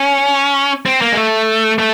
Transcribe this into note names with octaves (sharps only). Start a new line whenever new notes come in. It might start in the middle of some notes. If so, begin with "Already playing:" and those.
Already playing: C#4
C4
A#3
G#3
A3
A3